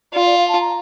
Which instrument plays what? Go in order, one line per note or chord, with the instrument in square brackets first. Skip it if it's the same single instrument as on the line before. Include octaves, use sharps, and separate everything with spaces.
[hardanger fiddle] F4 [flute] D5
[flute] D5
F5
A5
A#5